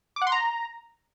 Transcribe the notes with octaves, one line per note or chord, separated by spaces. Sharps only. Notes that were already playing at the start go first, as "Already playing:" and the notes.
D6
F#5
C6
A#5